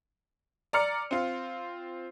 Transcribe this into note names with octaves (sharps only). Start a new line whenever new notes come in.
D5 A#5 F6 C#7
C4 F4